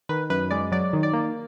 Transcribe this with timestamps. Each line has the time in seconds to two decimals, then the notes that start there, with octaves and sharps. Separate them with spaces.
0.09 D#3 B4
0.30 F#2 B4
0.51 G#3 D5
0.72 F#3 D5
0.93 D#3
1.03 D5
1.13 A#3